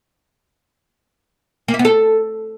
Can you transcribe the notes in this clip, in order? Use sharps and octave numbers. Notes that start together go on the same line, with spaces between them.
A#3
E4
B3
A4